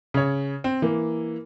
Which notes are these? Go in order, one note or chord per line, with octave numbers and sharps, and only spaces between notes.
C#3 C#5
C4
E3 A#3